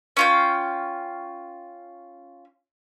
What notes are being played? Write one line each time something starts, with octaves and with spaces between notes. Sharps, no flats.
C#4 F4 G5